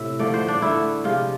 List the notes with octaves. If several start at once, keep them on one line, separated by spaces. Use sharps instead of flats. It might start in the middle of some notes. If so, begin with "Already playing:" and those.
Already playing: A2 C3 E5
D3 F3 A3 D5
C5
D4
D3 A3 E4
C3 F3 G#3 F4